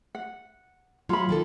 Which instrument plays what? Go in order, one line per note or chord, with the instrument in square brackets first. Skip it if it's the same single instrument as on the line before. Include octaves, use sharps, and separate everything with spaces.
[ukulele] F#5
[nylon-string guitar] F#3 [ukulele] F4 B5
[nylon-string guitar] D#3 A#3 A4